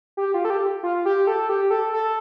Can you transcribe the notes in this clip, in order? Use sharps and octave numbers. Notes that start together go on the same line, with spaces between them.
G4
F4
A4
G4
F4
G4
A4
G4
A4
A4